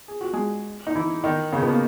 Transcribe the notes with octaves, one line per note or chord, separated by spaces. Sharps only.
G#4
F#4
G#3 G#4
D#4
E3 E4
D#3 D#4
C#3 C#4
B2 B3
A#3